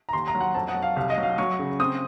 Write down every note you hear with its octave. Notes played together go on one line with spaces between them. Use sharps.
A#5
D#2 C6
A#5
F#3
F#5
F2 A5
F#5
F#3
F5
C2 F5
D#5
F#3
F5
F#3 C#6
C#3
C4 D#6